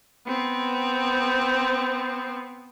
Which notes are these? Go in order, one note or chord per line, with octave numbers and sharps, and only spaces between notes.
B3 C4